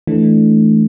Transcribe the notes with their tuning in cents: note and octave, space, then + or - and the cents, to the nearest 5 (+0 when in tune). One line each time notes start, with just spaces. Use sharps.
E3 +0 A3 -5 D4 +0